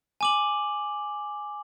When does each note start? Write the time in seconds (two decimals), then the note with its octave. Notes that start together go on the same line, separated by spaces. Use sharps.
0.21 G#5 D6 F#7